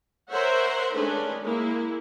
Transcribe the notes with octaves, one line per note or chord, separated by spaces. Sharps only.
A#4 C5 C#5 E5 F#5
D#3 G#3 A3 C#4 D4 B4
G#3 A#3 E4